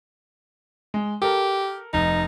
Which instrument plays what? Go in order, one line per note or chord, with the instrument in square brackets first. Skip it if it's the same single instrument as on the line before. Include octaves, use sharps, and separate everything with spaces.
[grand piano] G#3
[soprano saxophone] G4 [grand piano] A4 A#4
[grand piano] F1 [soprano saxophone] D#4